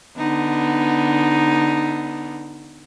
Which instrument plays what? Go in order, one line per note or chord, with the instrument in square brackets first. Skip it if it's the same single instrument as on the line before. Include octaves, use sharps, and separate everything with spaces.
[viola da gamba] D3 B3 D#4